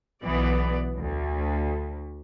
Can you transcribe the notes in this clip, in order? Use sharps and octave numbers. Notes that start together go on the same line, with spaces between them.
B1 E3 B3 D5
D2